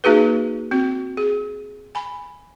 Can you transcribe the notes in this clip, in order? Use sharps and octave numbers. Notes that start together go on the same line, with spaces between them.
A#3 D#4 F#4 G#4 B4
C4 F#4
G#4
G#5 B5